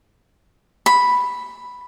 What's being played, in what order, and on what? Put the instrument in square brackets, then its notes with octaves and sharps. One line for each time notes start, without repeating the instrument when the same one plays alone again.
[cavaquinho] B5